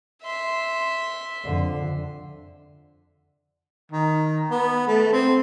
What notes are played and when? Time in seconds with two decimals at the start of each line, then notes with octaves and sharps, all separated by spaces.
0.23 E5 C6
1.45 F2 D3
3.92 D#3
4.51 B3
4.87 A3
5.13 C4